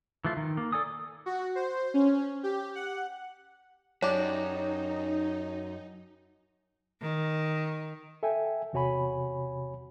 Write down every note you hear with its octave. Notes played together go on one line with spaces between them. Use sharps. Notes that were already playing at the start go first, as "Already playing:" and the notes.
E3 F3 A3 F4
D#3
A#3
A4 D5 G#5 D#6
F#4
C5
C#4
G4
F#5
F#2 D4 D#4 G4 C#5
D#3
A4 E5 G5 G#5
E2 C3 F#4 C#5 G#5 B5